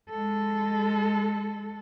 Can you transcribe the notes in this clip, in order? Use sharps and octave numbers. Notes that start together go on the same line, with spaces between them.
G#3 A4